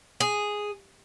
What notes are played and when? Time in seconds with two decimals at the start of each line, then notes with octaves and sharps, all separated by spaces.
0.20 G#4